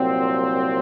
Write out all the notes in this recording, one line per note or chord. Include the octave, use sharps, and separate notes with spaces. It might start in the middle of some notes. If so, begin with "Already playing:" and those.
Already playing: C2 A#2 F#3 C4